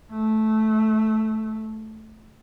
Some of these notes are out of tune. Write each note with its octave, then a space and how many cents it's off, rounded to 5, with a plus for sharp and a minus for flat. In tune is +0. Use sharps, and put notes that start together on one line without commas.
A3 -10